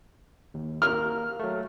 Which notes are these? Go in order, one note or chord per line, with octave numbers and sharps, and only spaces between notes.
D#2
A#3 A#4 F6
F#3 A3